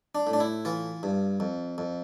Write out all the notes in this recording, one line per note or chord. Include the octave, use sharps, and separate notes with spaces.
D4
A2
D4
E4
E3 F4
G2
F2
F2